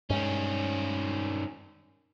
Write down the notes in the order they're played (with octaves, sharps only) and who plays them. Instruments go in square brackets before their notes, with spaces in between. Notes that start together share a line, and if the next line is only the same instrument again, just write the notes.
[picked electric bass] G2 G#3 [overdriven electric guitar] D#3 C#4